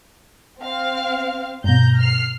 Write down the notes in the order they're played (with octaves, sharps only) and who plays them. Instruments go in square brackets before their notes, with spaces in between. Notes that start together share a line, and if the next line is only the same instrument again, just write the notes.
[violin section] C4 F5
[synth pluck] G2 B2 [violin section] A#5 G6
[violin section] F6 C7